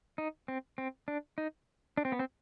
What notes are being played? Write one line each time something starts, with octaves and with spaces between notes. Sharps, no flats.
D#4
C4
C4
D4
D#4
D4
C4
B3
C4